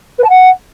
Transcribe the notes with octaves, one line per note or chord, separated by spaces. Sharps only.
B4
A5
F#5